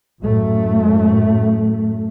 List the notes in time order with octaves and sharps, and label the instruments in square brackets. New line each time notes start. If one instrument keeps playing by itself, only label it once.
[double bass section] F#2 A2 A3